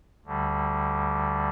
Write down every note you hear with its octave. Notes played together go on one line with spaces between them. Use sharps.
D2 D3 G3